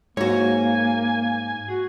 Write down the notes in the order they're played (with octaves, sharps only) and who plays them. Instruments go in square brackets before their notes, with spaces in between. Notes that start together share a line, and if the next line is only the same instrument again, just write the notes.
[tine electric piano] G#2 [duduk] A#3 [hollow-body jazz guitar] F#4 C#5 [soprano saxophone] G#5
[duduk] F#4 [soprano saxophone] G#4